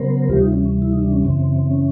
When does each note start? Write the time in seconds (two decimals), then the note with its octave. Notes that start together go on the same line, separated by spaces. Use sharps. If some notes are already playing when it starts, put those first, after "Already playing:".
Already playing: C#3 F#3 B3 A#4 C5
0.29 D2 C3 E3 G3 F4 G4
0.40 D#4 F4
0.53 C#4
0.82 E4
0.92 D#4
1.03 D4
1.12 C#4
1.23 F#2 C#3 E3 C4
1.70 C#4